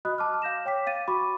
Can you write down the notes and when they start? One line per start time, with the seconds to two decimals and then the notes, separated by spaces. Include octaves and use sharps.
0.05 F#4 D#5 B5 D#6 F#6
0.18 A5 D6 F6
0.42 F5 G6 A#6 E7
0.65 C#5 G5 D6 B6
0.87 F5 A6 D#7
1.08 F#4 B5 C#6 D6